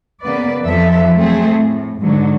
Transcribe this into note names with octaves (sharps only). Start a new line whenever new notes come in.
C#3 A#3 B3 B4 D5
F2 F3 A4 E5
F#3 A3 C4 G#4
A2
G#2 D3 F#3